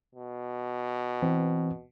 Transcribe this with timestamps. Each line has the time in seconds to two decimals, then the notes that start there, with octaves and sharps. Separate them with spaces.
0.15 B2
1.22 E3 C4